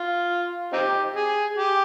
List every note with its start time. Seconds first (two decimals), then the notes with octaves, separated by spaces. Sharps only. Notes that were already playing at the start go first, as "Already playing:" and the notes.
Already playing: F4
0.73 C4 D#4 G4
1.16 G#4
1.58 G4